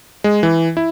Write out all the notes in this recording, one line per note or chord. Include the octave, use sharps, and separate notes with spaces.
G#3
E3
E4